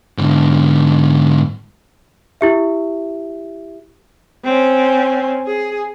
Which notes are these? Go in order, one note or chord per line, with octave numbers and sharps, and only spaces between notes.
G#2 D3
E4 G4 E5
C4 C#4
G#4